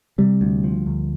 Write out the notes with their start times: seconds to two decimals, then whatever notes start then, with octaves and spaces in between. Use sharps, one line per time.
0.18 C3 G3
0.41 D2
0.64 F3
0.86 D2